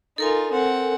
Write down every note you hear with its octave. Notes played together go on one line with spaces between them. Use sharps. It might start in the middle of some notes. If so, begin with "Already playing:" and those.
D#4 F4 A4 A#4 G#5
C4 F#5